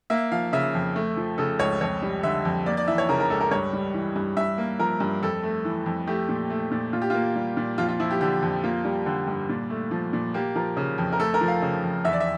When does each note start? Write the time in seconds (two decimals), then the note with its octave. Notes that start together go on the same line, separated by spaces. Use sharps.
0.10 A#3 E5
0.32 F3 F5
0.53 C#3 E5
0.74 F2
0.96 A3
1.17 F3
1.38 C#3 A4
1.59 C#2 C#5
1.81 F2 C#5
2.02 G3
2.23 D3 E5
2.45 F2
2.66 A#3 D5
2.77 D5
2.88 E3 E5
2.98 C#5
3.09 C#3 A#4
3.20 A#4
3.30 C#2 A4
3.40 A#4
3.51 G2 C#5
3.73 G3
3.94 E3
4.16 G2
4.37 G2 E5
4.58 A#3
4.79 F3 A#4
5.00 G2
5.22 F2 A4
5.43 A3
5.65 E3
5.86 F2
6.07 A3 G4
6.29 A#2
6.50 A3
6.71 A#2
6.93 A#2 F4
7.02 G4
7.10 A#3 F4
7.36 G3
7.57 A#2
7.78 F2 F4
7.89 F4
8.00 F3 E4
8.11 G4
8.21 D3 G4
8.43 F2
8.64 A#3 F4
8.85 G3
9.06 D3
9.27 G2
9.49 A#2
9.70 A3
9.91 F3
10.13 A#2
10.34 A#3 G4
10.55 F3 A#4
10.77 C#3
10.98 F2
11.12 A#4
11.20 A3 A4
11.34 A#4
11.41 F3
11.48 F5
11.62 C#3
11.83 F2
12.05 E2 E5
12.13 D5
12.20 E5